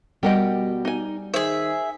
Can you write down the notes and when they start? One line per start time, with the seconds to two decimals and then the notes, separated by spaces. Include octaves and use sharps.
0.23 B2 G3 G4 A#4 D#5 F#5
0.85 D#4 G#5
1.34 D#3 G#4 C5 E5